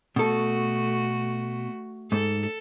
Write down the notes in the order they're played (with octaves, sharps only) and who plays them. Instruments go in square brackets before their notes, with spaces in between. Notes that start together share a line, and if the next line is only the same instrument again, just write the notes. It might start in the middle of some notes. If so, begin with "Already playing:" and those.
[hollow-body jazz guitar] B2 A4 [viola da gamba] A3 F#4
[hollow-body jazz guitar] G#2 [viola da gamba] A4